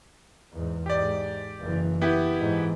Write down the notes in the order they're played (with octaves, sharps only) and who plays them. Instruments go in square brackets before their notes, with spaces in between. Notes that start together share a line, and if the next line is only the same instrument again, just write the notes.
[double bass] E2 G#2
[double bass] G#2 [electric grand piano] G4 D5
[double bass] F#1 E3
[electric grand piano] B3 E4 G4
[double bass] G#2 E3